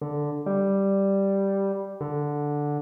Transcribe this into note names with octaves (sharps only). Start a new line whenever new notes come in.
D3
G3
D3